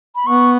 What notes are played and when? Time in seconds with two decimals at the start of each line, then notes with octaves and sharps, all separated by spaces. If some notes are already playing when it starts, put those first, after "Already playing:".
0.15 B5
0.27 B3 C#6